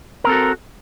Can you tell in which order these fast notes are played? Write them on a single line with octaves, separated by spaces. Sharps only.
A#4 C4 A4 F#4